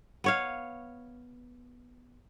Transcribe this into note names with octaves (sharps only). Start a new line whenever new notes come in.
B3 C#5 F5